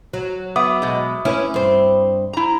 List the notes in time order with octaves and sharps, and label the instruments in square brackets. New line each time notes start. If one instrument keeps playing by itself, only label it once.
[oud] F#3
[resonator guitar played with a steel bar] B3 [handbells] E5 D6 D#6
[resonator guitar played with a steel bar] B2 G#3
[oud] C#4 B4 [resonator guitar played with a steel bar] E4
[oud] G2 C4
[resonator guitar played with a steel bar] E4 A#5